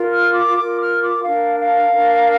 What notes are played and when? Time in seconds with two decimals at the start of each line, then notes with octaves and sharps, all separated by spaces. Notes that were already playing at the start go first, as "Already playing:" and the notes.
Already playing: F4 A#4
0.13 F6
0.34 D6
0.57 F4 A#4 D6
0.81 F6
1.03 D6
1.25 D4 A#4 F5
1.60 F5
1.94 D4 A#4